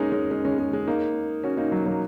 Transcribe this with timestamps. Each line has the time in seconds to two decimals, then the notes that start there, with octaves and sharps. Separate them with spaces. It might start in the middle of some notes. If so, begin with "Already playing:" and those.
Already playing: G#3 A#3 C#4 D#4
0.12 G#3 C#4
0.31 G#3 C#4
0.45 G#3 C#4
0.59 G#3
0.73 G#3 C#4
0.87 A#3 D#4
1.44 C#4 F#4
1.57 A#3 D#4
1.72 F#3
1.86 F#3 A#3